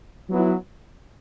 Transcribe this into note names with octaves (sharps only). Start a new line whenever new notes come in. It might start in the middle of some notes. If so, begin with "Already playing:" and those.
F#3 B3 E4